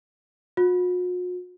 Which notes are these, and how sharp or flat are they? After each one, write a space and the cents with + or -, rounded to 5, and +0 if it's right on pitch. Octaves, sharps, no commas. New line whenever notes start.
F#4 -45